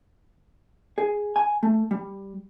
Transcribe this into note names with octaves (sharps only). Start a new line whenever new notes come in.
G#4
G#5
A3
G3